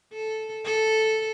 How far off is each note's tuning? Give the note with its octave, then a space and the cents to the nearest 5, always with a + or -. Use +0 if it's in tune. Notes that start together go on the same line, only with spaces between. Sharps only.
A4 -10
A4 -5